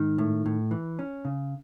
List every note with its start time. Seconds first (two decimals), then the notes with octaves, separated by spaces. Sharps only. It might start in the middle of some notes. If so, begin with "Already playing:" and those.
Already playing: G#2 D#3
0.18 A2
0.46 A2
0.71 E3
0.99 C#4
1.25 C#3